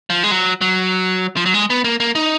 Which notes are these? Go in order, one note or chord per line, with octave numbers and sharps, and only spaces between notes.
F3
G#3
F#3
F#3
F3
F#3
G#3
B3
A#3
A#3
D#4